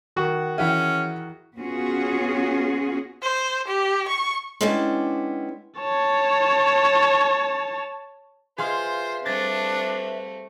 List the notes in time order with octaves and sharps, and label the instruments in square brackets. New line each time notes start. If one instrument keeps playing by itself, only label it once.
[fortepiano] D#3 F#4
[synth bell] E3 E4 G#4 [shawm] C#4 [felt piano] E5 F#5 G5
[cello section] B3 C#4 F4 F#4 G#4
[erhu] C5
G4
C#6
[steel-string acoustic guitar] G#3 B3 C#4 D4 E4 G4
[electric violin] C#5 A5
[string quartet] F4 [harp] G#4 F5 C6 [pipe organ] B4 E5 [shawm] C5
[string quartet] G3 A3 C4 [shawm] D4 [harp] A6 A#6